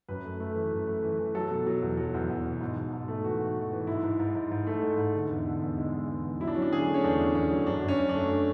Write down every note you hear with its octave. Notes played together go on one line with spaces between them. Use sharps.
F#2 B4
A3
A3
E3
F#2
A3
E3
E3
F#3 A4
B2
F#3
E2
F#3
E2
E2
B2
G#2
G#2
G#2
A3
E3 F#4
E3
G#2
E3
G#2 E4
G#2
G#2
G#2
G#2
A3
G#2
G#2
D3
E2
D3
E2
G#3
G#3
E2
E2
F#3 E4
D4
F#3 C#4
D4
D3 G#4
A3
C#4
E2 D4
E2
E2 C#4
F#3
F#2 D4
F#2
C#4
F#2
D4
A3